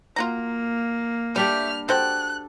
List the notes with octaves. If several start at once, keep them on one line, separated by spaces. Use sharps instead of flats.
A#3 F4 F#4 A#5
G3 A3 D4 G4 F6
F#4 A4 C5 G5 F#6